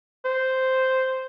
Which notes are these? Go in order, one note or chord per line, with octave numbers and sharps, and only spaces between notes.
C5